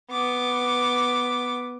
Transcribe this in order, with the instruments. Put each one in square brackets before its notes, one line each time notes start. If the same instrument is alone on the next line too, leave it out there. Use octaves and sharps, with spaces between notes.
[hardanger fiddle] B3 D6